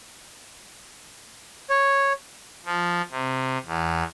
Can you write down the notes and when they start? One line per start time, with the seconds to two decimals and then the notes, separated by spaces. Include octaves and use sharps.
1.70 C#5
2.65 F3
3.11 C3
3.66 E2